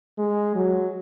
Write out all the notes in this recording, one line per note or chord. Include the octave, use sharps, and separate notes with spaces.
G#3
F#3